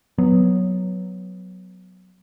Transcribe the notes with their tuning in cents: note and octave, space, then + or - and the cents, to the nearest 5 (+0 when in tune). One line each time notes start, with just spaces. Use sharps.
F#3 +0 B3 +0